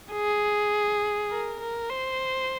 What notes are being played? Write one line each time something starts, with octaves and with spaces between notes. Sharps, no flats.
G#4
A#4
A#4
C5